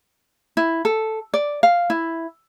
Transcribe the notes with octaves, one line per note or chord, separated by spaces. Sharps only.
E4
A4
D5
F5
E4